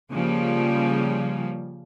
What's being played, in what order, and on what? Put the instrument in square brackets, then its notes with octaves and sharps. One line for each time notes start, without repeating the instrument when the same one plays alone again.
[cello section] C#3 F3 G3 A#3